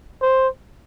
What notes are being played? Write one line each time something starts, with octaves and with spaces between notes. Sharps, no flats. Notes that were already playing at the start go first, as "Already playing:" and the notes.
C5